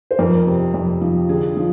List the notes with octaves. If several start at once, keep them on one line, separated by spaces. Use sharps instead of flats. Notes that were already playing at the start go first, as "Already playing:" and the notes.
C5
F2 A#4
C3
F2
F3
D3 G#4
F3